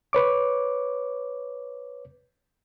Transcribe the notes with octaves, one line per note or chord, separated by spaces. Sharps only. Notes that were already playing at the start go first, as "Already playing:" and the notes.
B4 C#5 D6